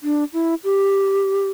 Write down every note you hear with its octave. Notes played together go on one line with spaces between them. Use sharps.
D4
E4
G4